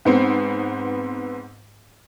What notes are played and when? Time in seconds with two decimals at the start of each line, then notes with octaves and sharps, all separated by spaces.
0.05 G#2 B3 C4